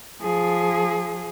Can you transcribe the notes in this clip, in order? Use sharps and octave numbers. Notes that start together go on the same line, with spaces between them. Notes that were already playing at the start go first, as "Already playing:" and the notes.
F3 G#4